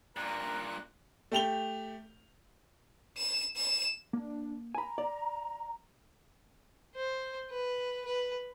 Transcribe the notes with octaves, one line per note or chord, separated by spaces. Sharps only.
G2 A#2 A#4 F#6
A3 G4 F7 G7
E7
E7
A#3 D4
G#5 A#5 B5
D5
C5
B4
B4